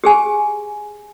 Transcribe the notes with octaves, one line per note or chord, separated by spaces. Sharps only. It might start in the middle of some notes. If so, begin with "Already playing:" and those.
G4 G#4 G#5